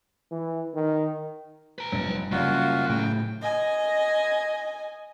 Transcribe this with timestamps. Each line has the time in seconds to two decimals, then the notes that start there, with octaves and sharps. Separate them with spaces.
0.31 E3
0.74 D#3
1.79 B4 A#5
1.92 F1 G2 F#3
2.32 F#1 F#3 G3 C#4 F4 F#4
2.89 A2 C#3 G5
3.42 D#5 G#5